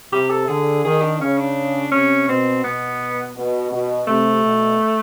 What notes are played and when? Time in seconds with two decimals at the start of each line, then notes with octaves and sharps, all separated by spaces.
0.12 C3 G4
0.30 A4
0.48 D3 G#4
0.84 D#3 G#4
1.02 D4
1.20 C#3 C#4
1.38 D4
1.91 C3 C#4
2.28 B2 C4
2.64 B2 B3
3.36 B2
3.71 B2
4.07 C3 A3
4.43 B2